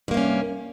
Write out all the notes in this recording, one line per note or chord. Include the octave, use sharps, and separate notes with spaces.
G2 C3 A#3 C#4